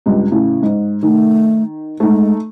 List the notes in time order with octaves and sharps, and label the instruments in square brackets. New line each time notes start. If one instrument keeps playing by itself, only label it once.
[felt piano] C#2 G2
A2 C#3
G#2
[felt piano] D#3 [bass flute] A3
[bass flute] G#3 [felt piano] A3 D#4